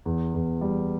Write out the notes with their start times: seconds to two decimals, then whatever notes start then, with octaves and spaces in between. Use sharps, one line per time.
0.06 E2
0.34 E2
0.61 G3